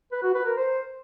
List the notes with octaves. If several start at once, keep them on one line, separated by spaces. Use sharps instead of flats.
B4
F#4
B4
A#4
C5